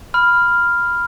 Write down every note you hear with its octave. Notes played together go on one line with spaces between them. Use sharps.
B5 F6